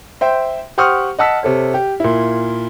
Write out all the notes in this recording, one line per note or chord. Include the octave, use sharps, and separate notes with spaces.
C5 E5 G5
G4 C5 F#5 C#6 D#6 F6
D#5 F#5 A5 E6 B6
C3 A4 C#5
G4
A#2 E4